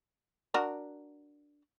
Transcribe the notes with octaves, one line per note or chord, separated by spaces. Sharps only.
D4 F#4 A#4